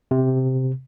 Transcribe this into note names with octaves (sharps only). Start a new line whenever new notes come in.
C3